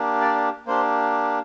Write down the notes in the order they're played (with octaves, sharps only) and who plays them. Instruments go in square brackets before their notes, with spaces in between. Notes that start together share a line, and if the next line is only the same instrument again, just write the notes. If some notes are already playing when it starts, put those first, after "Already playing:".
Already playing: [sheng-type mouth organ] A#3 D4 G4
D5
A#3 D4 G4 C5